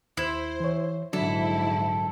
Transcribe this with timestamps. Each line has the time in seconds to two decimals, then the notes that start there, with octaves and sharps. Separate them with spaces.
0.17 D#2 E4 C5
0.60 E3 C#5
1.13 A#1 G#2 D3 F#3 D4 E4 A4